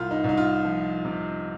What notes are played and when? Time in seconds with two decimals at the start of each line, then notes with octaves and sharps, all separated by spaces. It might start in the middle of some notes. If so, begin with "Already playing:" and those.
Already playing: C2 F4
0.11 D#4
0.24 C2 D#4
0.37 F4
0.65 F3
1.05 C3